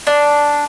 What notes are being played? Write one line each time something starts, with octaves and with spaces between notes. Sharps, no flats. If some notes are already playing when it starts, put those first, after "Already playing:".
D4